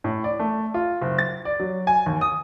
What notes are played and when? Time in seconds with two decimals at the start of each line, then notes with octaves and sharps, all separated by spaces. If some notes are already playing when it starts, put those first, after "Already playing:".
0.04 A2
0.24 D5
0.39 A3
0.74 F4
1.01 F#1
1.19 A6
1.45 D5
1.60 F#3
1.87 G#5
2.06 D#2
2.21 D#6